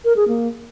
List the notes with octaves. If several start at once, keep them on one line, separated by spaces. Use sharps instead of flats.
A#4
G#4
A#3